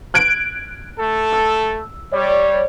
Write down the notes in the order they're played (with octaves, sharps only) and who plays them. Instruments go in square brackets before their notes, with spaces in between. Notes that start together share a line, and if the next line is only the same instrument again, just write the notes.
[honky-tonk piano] F#6 G#6 D7
[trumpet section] A3 A4
[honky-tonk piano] E6
[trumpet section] G3 [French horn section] C#5 D5